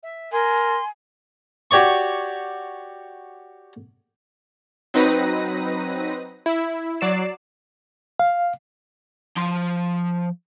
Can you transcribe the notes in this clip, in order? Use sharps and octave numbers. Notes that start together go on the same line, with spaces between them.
E5
A#4 G#5 C6
F#4 G4 C#5 D5 C#6
F#3 C4 D#4 B4 A#6 D#7
E4
F#3 D5 C7 E7
F5
F3 C6